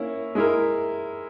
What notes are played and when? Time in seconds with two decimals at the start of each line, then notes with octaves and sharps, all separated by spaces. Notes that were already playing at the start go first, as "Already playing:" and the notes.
Already playing: A#3 C#4 E4
0.35 G#3 E4 A#4